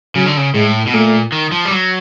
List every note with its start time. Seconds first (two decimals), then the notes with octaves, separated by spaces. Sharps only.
0.15 C#3 F#3
0.26 D3
0.37 C#3
0.54 A2 G#3
0.87 B2
0.93 A#2 A3
1.32 D#3
1.52 F3
1.65 G3
1.71 F#3